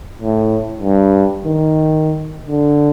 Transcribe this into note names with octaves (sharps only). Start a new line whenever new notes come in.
A2
G2
D#3
D3